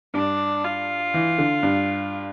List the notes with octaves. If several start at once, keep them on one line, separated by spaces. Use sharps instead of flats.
G2 D4
F4
E3
D3
G2